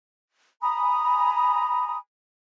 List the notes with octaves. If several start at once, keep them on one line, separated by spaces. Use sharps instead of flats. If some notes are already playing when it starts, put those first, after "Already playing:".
G#5 A#5 B5 D#6